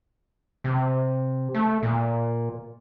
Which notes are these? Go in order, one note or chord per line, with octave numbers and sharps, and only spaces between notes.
C3
A3
A#2